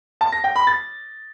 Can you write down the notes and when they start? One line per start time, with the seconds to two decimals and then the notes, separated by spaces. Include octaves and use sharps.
0.21 A5
0.32 A#6
0.44 G5
0.56 B5
0.67 A6